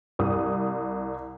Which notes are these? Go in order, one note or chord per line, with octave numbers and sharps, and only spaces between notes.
C2 D#6